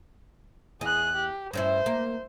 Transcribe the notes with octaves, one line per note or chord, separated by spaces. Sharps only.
E2 G#4 D#5 F#6
G4
G2 C#4 E4 C5
A#3